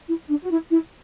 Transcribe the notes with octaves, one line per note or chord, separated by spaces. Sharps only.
E4
D4
F#4
E4
E4